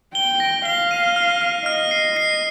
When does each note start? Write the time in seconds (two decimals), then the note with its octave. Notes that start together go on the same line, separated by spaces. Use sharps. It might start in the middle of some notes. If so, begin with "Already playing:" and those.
0.15 G5 G7
0.40 A#6
0.65 F5 G7
0.91 D#7
1.16 F6
1.41 F6
1.66 D#5 F6
1.91 C7
2.16 C7